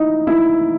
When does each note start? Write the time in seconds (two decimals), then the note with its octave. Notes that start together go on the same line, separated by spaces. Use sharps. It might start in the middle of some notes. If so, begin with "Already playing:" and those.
Already playing: D#4 E4
0.27 E4